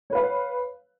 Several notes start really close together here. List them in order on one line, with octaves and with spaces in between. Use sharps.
C#5 B4 F5